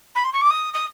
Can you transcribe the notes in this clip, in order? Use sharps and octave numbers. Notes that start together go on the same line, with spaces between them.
B5
C6
C#6
D6
D#6
D#6